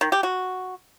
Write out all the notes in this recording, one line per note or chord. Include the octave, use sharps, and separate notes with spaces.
D#3
G4
F#4